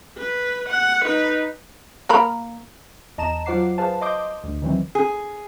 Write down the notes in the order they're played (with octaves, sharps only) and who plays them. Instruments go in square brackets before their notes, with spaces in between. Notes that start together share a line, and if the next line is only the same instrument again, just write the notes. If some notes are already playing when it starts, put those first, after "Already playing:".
[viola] B4
F#5
D#4 B4
[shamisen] A#3 A#4 B5
[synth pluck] E2 D#5 A5 A#5 E7
F#3 F4 C5 F#5 D6 C7
G#4 B4 C5 F5 A5
D#5 C6 D6 D#6 G6
D2
D#3 E3 F#3 C4
[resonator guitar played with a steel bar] G#4